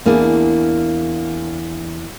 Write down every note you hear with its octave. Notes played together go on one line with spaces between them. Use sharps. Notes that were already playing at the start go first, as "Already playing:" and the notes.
E2 A#3 D4 E4 G#4